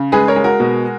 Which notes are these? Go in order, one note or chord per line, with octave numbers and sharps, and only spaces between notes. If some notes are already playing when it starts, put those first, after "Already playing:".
Already playing: C#3
G#3 G#4 B4
A#4 C#5
G#3
F#4 A#4
B2